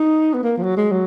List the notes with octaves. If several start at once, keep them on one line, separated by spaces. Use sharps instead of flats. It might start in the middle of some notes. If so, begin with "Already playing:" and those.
Already playing: D#4
B3
A#3
F3
F#3
G#3
F#3